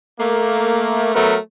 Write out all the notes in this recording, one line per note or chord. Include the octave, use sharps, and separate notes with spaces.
A3 A#3
F#3 A3 B3 A#4